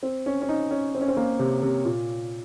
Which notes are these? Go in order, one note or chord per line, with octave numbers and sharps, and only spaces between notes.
C4
C#4
C#4
D#4
C#4
C4
C#4
C4
A#3
C3
C3
A#2